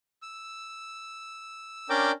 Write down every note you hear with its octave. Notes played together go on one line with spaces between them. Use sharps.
E6
C#4 D4 A#4 D5 G5 D6